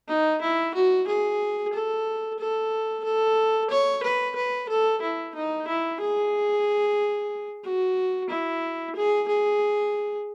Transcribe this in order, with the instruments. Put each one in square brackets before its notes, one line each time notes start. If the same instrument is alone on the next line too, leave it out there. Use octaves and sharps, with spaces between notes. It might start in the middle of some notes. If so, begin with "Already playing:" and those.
[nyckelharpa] D#4
E4
F#4
G#4
A4
A4
A4
C#5
B4
B4
A4
E4
D#4
E4
G#4
F#4
E4
G#4
G#4